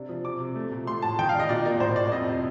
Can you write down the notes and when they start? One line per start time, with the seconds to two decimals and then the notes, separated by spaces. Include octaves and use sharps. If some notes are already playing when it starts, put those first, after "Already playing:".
Already playing: C3 D4
0.09 F3
0.24 C3 D6
0.40 C3
0.55 A3
0.71 A#2
0.87 A3 C6
1.02 A2 A5
1.19 D#3 G5
1.29 F5
1.34 D4
1.40 D#5
1.49 A#2 D5
1.65 A#3 D5
1.80 A2 C5
1.96 A2 D5
2.12 F2 D#5
2.28 C3